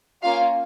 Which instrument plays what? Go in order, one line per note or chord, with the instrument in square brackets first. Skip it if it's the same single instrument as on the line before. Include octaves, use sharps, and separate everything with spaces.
[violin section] A#3 C#4 F4 F5